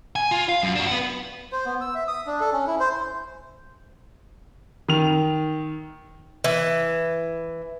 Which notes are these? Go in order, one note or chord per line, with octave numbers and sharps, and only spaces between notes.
G#5
F4
F5
F#2
D4 F#4
B4 F#5
C5
B3
E6
E5
D#6
D4
A4
C#4
E4
C5
D#3 F7
E3